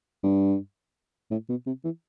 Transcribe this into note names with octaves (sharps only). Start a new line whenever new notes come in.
G2
A2
B2
C3
E3